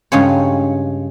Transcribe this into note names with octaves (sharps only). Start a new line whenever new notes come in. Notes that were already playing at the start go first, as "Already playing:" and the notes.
G2 C#3 G#3 C#4 F4 C#5